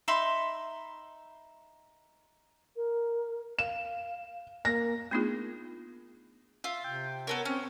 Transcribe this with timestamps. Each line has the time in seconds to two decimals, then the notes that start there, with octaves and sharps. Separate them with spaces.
0.08 D#4 E5 B5 C6
2.76 A#4
3.59 F5 E7
4.65 A#3 A#6
5.11 A3 B3 D4 D#4 F4 G#4
6.64 F4 E5
6.84 C3 G5
7.27 B3 A4 A#4 C#5
7.45 C4 C#4